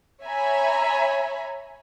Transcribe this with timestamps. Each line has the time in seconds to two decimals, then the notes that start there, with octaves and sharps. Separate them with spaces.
0.23 C#5 E5 G#5 A#5 B5